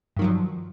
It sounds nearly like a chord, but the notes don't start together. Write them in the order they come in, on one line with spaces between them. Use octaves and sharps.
G2 D#3 F#3 F3